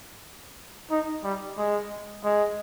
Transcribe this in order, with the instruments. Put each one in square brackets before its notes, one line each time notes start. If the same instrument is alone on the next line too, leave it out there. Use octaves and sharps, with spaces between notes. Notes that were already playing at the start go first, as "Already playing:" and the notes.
[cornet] D#4
G3
G#3
G#3